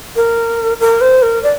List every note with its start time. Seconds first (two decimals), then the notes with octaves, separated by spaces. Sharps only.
0.16 A#4
0.80 A#4
1.01 C5
1.22 A#4
1.43 D5